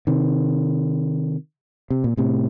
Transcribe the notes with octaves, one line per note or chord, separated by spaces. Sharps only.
C3 D#3
C3
A#2
A2 C3